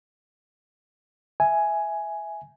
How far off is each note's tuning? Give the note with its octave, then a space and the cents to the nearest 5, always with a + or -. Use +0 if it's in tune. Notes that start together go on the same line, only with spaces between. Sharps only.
E5 +0 G#5 +5